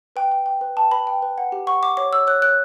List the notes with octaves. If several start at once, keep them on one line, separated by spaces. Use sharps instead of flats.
B4 G5
G5
G5
B4
G5 A5
B4 B5
G5
B4
F#5
G4
F#5 C#6
F#5 D6
C#5 D6
C#5 E6
C#5 F#6
C#5 F#6